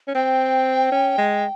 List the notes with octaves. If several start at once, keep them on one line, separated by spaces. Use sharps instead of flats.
C#4
C4 G5
C#4
G#3